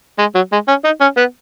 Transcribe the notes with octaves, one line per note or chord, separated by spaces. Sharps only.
G#3
F#3
G#3
C#4
D#4
C#4
B3